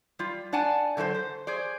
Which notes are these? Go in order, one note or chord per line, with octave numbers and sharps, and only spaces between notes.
G3 F4
D4 D5 F#5 G#5 A5
D3 F#3 A3 A4 C5
C5
G#4 C5 D5